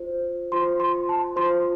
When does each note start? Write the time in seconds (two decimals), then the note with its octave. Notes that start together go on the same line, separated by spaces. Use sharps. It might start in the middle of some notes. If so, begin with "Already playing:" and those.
Already playing: F4 C5
0.52 F4 C5 C6
0.80 C6
1.09 A5
1.36 F4 C5 C6